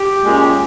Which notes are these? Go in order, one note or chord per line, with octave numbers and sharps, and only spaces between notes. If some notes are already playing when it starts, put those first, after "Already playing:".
Already playing: G4
A#2 G#3 C#4